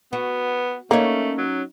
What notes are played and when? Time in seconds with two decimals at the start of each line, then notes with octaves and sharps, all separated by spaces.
0.13 B3 F#4
0.91 A3 A#3 C#4 D#4 C#5
1.38 F#3